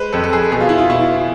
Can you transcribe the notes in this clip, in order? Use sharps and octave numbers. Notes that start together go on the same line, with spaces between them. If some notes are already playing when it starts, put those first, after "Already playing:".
Already playing: G#3 B4 C5
F2 A4
A4
G#4
B2 G#4
F4
E4
F4
B2 E4